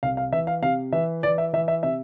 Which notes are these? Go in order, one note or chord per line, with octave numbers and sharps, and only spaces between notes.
C2 F5
F5
E3 E5
F5
C3 F5
E3 E5
E3 D5
E5
E3 E5
E5
C3 E5